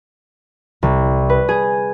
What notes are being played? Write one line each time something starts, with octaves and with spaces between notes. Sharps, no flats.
C2
B4
G#4